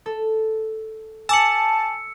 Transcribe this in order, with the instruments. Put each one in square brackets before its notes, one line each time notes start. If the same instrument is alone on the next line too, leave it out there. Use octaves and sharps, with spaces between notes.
[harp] A4
[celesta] G#5 D6 F#7 [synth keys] A5 [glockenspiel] E6 C#7